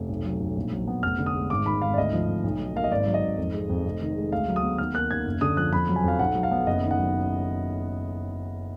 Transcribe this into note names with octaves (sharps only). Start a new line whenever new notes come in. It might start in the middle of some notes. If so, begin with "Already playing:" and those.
Already playing: F1
B1
F#3
B1
A#1
F#3
B3
F1 F6
D3
D#6
G#3
G#1 D6
D#3 B5
G#1 F5
D5
D2 D#5
F3
D2
B1
F#3
A#3 F5
D#5
G#1 D5
F#3
D#5
G#1
F2
G#3
F2
F1
D#3
G#3
D2 F5
F#3
D#6
B3
D#2 F6
A#3 F#6
D#2 G#6
F#1
D3 D#6
F3 F#6
F2 B5
F#3
G#5
F2 F5
B1 F#5
F#3
F5
B3
F#1 D#5
D#3
F#5
F#3